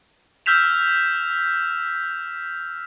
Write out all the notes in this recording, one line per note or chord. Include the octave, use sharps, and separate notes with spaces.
E6 F6 G6 B6 E7 F7